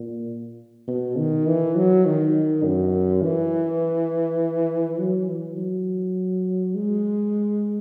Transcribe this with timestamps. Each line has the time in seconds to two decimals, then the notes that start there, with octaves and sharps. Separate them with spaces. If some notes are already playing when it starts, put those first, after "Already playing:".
Already playing: A#2
0.88 B2
1.18 D#3
1.47 E3
1.76 F#3
2.06 D#3
2.64 F#2
3.22 E3
4.99 F#3
5.28 E3
5.57 F#3
6.75 G#3